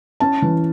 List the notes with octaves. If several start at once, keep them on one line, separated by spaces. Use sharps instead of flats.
C#4 A5
E3